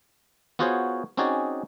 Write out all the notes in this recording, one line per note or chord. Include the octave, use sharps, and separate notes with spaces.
B3 F4 F#4 G#4 C5 C#5
C4 C#4 D#4 F#4 G#4 D5